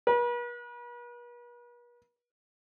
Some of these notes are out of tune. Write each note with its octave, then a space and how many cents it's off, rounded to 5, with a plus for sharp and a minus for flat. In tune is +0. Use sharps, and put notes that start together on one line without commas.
B4 -45